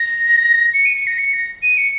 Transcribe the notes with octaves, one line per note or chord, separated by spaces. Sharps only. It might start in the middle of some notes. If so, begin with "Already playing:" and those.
Already playing: A#6
C#7
D#7
C#7
A#6
C#7
A#6
D#7
C#7